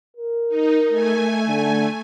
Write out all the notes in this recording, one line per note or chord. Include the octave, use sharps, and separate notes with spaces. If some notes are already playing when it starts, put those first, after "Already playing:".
A#4
D#4
A3 G#5
D3